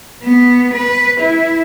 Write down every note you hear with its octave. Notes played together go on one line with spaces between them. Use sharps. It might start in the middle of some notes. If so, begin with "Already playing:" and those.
B3
B4
E4